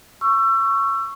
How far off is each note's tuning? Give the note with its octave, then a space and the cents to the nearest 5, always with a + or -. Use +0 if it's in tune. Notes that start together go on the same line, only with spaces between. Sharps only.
C#6 +0 E6 +30